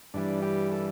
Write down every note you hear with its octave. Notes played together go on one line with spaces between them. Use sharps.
G2 E3 G3 D4
G4
A4